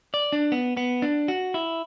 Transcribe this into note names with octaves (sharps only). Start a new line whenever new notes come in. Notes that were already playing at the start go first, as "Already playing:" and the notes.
D5
D4
B3
B3
D4
F#4
E4